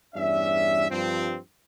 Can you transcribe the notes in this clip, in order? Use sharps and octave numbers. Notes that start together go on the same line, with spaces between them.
E2 G2 C#4 D5 E5
G2 F3 C4